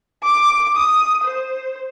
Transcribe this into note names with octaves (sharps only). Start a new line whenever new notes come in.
D6
D#6
C5